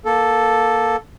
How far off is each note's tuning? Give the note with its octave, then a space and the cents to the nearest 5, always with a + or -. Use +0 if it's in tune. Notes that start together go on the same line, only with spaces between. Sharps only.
A#3 +15 A4 +0